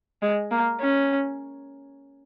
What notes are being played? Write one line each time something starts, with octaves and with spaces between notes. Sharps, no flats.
G#3
A#3
C#4